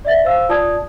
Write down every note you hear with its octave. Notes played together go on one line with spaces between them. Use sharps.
D5 E5 A6
C5 F5 E6
F4 D5 A5 D#6 G#6